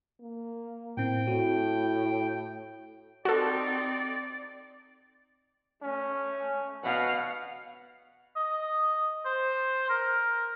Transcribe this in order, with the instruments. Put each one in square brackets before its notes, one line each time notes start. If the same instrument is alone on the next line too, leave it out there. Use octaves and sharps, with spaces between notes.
[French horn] A#3
[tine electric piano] A2 C4 [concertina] G5
[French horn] A2 [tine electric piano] F#4
[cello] C4 D#4 [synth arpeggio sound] F#4 A4 [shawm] D5
[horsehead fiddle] A3 [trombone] C#4
[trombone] B2 [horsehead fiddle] F5 F#5
[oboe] D#5
C5
A#4